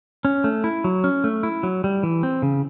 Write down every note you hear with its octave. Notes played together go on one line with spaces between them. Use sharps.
C#4
A3
E4
F#3
C#4
A3
E4
F#3
G3
E3
C4
C#3